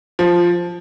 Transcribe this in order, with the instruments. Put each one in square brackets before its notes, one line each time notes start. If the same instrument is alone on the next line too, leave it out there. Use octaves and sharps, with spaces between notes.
[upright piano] F3